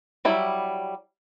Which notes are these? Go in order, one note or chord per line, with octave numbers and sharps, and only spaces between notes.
F#3 G3 E4